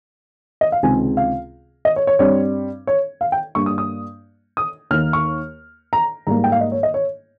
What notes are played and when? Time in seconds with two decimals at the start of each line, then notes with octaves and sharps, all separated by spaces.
0.61 D#5
0.72 F5
0.83 C#2 C3 D#3 G#3 C4 G#5
1.17 F5
1.85 D#5
1.96 C#5
2.07 C#5
2.19 G2 G3 C4 C#5
2.87 C#5
3.21 F5
3.32 G5
3.55 G2 G3 A#3 C#6
3.66 D#6
3.78 D#6
4.57 D#6
4.91 D#2 D#3 A#3 F6
5.13 C#6
5.93 A#5
6.27 G#2 G3 A#3 A#5
6.44 G5
6.52 F5
6.61 D#5
6.72 C#5
6.83 D#5
6.94 C#5